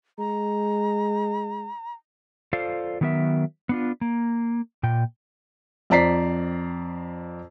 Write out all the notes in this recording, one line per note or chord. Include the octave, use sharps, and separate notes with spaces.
G#3 A#5
F4 A4 C5 D5 F5
D#3 F#3 B3 A#4 E5
B3 D4 F4
A#3
A#2 G5
F2 C4 D5 A#5 B6 C7